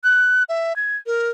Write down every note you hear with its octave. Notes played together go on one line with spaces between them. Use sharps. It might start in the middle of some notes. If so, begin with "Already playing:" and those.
F#6
E5
G#6
A#4